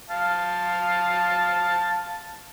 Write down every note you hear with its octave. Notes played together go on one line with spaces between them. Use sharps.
F5 A5